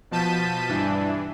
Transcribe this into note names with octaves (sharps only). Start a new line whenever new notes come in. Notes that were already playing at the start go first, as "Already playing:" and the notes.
B2 F3 A5 G6 B6 D#7
G2 E3 D4